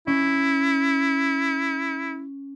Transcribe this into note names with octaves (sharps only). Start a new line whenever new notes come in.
C#4 E4